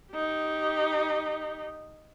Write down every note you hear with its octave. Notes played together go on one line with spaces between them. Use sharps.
D#4 G4